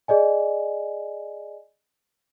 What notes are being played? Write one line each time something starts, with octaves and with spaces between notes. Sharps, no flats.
G#4 D5 D#5 G#5